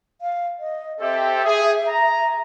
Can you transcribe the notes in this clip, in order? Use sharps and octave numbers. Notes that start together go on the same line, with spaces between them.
F5
D#5
C4 G4 A4 E5
G#4
A#5